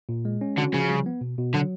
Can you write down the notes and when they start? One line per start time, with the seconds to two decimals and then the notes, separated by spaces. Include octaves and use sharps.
0.09 A#2
0.25 G#3
0.41 C#4
0.57 D3 F#4
0.74 C#3 F3
0.90 G3
1.06 B3
1.21 B2
1.38 B2
1.54 D3 F#3